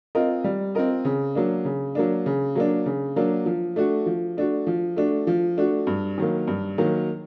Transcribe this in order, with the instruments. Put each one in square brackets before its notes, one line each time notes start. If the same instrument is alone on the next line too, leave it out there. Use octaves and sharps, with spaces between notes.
[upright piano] C4 F4 A#4 D#5
G3
C4 F4 A#4 D#5
C#3
F#3 A#3 D4
C#3
F#3 A#3 D4
C#3
F#3 A#3 D4
C#3
F#3 A#3 D4
F3
A3 D4 F#4
F3
A3 D4 F#4
F3
A3 D4 F#4
F3
A3 D4 F#4
G2
D#3 F#3 A#3
G2
D#3 F#3 A#3